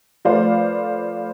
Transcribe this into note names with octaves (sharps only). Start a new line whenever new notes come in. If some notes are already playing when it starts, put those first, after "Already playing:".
F3 A3 B4 C5 D5 F5